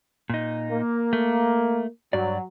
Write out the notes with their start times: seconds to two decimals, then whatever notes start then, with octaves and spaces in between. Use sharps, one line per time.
0.30 A#2 D#4
0.71 A#3
1.13 A3
2.13 G2 F#3 D5